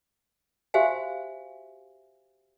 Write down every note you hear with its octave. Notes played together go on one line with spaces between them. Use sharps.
F#4 G4 C5 E5 F5 G#5